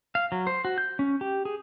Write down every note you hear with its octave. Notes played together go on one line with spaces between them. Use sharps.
F5
F#3
C5
F#4
G6
C#4
G4
G#4